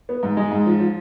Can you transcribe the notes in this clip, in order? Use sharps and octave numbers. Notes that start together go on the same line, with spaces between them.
B3
G#2
G#3
G#2
F3
F3